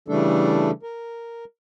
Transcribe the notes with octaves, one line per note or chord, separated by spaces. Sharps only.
C#3 E3 G3 A3 D4 A4
A#4